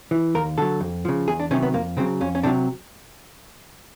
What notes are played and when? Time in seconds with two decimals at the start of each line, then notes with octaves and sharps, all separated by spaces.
0.11 E3
0.35 D#2 A#4
0.58 D3 F#3 A4
0.80 F2
1.05 C#3 F3
1.28 E2 G#4
1.40 D4
1.51 C3 D#3 F#3 C#4
1.62 B3
1.74 F2 A#3
1.97 C#3 F#3 C4
2.21 F2 C#4
2.35 C#4
2.43 C3 D#3 F#3 D4